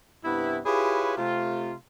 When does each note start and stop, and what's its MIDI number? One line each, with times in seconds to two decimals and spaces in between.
0.24 0.59 43
0.24 0.59 48
0.24 0.59 59
0.24 0.59 64
0.66 1.13 64
0.66 1.13 65
0.66 1.13 67
0.66 1.13 68
0.66 1.13 71
0.66 1.13 73
1.18 1.74 48
1.18 1.74 57
1.18 1.74 65